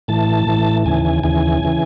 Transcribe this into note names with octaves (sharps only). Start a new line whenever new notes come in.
A2 E3 A5
A2 E3
D#2 C#3 E3 G#5
G#5
D#2 C#3 E3 G#5
C#3 E3